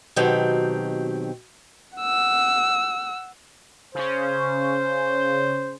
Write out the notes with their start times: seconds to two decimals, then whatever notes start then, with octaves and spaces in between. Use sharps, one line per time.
0.16 B2 D#3 F#3 C4 G4
1.98 F#5 E6
3.95 C#3 C#4 C5